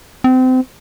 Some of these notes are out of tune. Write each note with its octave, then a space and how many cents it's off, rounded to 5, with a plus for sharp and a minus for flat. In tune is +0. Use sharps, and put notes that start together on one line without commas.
C4 -30